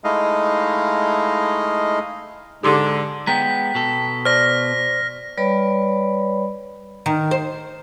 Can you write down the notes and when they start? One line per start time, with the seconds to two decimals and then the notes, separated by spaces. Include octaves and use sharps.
0.04 G#3 A3 D#4 E4 D#5 F5
2.63 G#2 D3 G4 C6 D6
3.27 G#3 B3 G5 A#5 B6
3.75 B2 A4
4.25 C5 D5 F6 A#6
5.38 G3 B4 C#5 D5 B5
7.06 D#3
7.31 C5